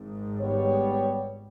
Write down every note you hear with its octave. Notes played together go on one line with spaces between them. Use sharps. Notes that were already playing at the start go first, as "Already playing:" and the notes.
Already playing: G#1 G#2
G3 B3 G4 C#5